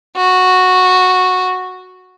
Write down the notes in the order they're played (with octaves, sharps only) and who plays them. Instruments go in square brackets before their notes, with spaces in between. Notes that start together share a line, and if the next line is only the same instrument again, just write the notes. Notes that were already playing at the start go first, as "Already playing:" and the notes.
[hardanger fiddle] F#4